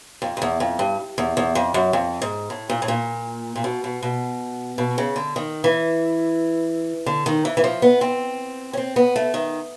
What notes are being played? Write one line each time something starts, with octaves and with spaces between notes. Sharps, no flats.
F2
F2
E2
F2
G2
E2
E2
F2
F#2
F2
G#2
A2
A#2
A2
A#2
A#2
B2
B2
B2
B2
C#3
D3
D#3
E3
D3
D#3
E3
E3
F3
B3
C4
C#4
C4
B3
A3
D#3